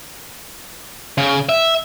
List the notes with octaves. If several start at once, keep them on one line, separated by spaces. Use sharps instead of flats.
C#3
E5